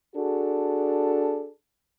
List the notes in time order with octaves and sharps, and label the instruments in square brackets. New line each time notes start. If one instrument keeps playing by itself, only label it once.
[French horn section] D4 F#4 G#4 A4